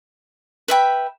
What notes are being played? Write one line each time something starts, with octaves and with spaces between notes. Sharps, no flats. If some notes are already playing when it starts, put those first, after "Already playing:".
B4 E5 G5